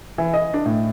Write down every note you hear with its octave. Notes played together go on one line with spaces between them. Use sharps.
E3
D#5
D4
A2